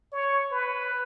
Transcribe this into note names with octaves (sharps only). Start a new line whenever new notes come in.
C#5
B4